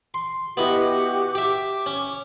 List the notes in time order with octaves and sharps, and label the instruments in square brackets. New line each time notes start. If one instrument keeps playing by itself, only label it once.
[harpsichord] C6
[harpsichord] B3 E4 D#5 [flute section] F#4 G4 D6
[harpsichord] G4 E5 [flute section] D6
[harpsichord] C#4